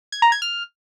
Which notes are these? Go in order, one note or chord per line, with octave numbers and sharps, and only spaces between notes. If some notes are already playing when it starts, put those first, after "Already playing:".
G#6
A#5
G#6
F6